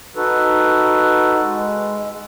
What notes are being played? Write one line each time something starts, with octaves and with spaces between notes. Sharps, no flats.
D#4 F#4 A4 B4
G#3